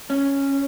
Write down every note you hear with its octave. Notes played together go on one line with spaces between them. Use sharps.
C#4